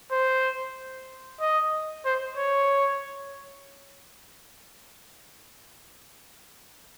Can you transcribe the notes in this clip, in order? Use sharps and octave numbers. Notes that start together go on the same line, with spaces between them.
C5
D#5
C5
C#5